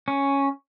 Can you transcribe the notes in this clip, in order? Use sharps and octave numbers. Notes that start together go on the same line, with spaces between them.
C#4